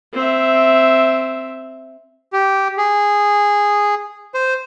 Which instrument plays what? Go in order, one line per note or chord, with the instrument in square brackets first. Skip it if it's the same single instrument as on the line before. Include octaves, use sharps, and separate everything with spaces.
[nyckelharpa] C4 E5
[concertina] G4
G#4
C5